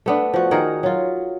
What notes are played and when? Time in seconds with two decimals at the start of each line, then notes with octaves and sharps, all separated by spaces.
0.06 A3 B3 D4
0.34 F3 F#4
0.51 D#3 G#4 A#4 F#5
0.83 F#3 F4